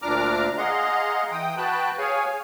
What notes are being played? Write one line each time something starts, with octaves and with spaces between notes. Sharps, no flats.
D2 A#2 D4 A#5 D6 F6
G#4 D#5 F5 F#5 A#5 C6
E3 G5 D#6
F#4 B4 G5 A5 F#6
G#4 C#5 F5 G#5